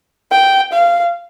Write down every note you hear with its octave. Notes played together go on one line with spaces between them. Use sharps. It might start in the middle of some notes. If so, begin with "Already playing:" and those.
G5
F5